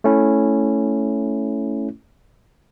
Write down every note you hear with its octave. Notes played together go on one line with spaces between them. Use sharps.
A3 C#4 E4